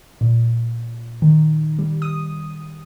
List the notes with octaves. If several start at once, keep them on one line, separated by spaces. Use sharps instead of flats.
A#2
D#3
G3
D#6